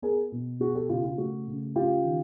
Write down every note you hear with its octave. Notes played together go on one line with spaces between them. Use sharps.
B3 G#4 A#4
B2
B3 F#4 G#4
G4 A4
C#3 F4 G4
F4
A3 F#4
C#3
C#4 F4 G4
D#3